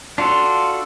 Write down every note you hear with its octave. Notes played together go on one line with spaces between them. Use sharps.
D4 F4 F#4 A4